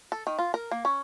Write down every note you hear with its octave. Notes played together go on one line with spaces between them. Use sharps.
A4
D#3
F4
A#4
A#3
C#4